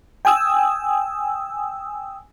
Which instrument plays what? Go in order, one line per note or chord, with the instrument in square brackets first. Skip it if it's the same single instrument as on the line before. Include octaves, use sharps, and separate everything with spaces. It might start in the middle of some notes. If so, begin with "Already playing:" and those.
[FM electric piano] G5 G#5 D#6 E6